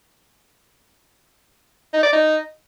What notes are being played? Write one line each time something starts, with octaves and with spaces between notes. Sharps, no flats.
D#4
D5
D#4